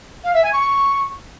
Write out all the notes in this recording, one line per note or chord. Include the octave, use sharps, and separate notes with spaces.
F5
E5
G#5
C#6